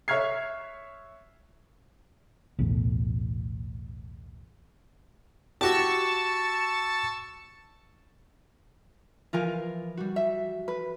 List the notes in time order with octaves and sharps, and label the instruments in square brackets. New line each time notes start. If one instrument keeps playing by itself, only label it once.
[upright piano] C#5 E5 C#6 F6 G#6 C7
[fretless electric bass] B1 E2 A2
[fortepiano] F#4 G4 [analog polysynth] A5 C#6 E6
[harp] E3 F3 [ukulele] F4 A#4 G#5
[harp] G3 F#4
[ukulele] E5
B4